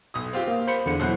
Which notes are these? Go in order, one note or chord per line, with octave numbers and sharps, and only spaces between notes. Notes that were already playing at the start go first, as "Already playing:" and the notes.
B1 D#6
C4 F4 G4
A#3
C5 B5 C#7
E2 D3 C#7
B2 F#3 E4 C5 F#5